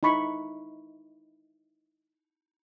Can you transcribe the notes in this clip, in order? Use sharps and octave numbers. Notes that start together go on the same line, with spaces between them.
D#4 E4 B5 C#6